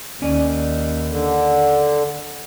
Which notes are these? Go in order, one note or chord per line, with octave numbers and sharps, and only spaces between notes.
D#2 C#4 D5 G#5
D3